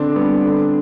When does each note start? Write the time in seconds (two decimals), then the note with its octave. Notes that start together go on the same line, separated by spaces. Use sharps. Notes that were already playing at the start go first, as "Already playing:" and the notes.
Already playing: D3 C4 D4
0.16 G3 B3
0.45 D3